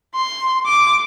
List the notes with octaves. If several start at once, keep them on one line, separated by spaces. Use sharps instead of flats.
C6
D6